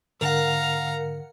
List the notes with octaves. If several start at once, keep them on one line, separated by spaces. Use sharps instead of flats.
G#2 D3 A#4 F5 F#5 A#5